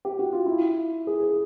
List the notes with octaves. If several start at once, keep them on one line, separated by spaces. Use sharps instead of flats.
G4
F#4
F4
E4
G#4
G#4